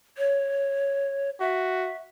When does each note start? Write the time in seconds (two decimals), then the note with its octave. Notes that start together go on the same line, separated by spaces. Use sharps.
0.18 C#5
1.40 F#4 E5